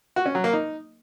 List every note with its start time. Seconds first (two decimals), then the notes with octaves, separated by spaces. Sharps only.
0.16 F#4
0.26 C#4
0.35 F#3
0.44 A#3
0.53 D#4